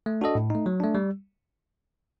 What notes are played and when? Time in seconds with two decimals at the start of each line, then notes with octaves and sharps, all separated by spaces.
0.06 A3
0.21 D4 F#4 A4 D#5
0.35 A2
0.50 A3 D#4
0.66 F#3
0.80 A3 D4
0.95 G3